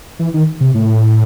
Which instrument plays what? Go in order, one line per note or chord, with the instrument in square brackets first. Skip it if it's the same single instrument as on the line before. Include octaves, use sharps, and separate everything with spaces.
[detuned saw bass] E3
D#3
C3
A2